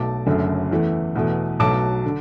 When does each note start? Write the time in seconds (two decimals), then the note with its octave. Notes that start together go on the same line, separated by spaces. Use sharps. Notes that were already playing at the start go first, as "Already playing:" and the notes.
Already playing: B1 B2 A3 A5 D6
0.26 F#1 F#2 D3 A3
0.71 E2 E3 A3
1.16 E2 B2 A3
1.59 B1 B2 F#3 A3 A5 D6
2.05 D3